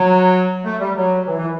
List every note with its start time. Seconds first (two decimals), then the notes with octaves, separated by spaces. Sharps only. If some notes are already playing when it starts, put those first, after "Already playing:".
Already playing: F#3
0.64 A3
0.79 G3
0.96 F#3
1.27 E3
1.37 E3